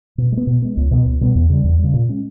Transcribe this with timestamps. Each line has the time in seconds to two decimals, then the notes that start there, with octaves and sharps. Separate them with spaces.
0.18 B2
0.32 G#3
0.37 B3
0.47 B2
0.62 G#3 B3
0.77 C#2
0.91 B2 G3 B3
1.05 C#2
1.21 B2 G3 B3
1.35 E2
1.50 C#3 G3
1.64 E2
1.79 C#3 G3
1.93 A#2
2.09 G#3 C#4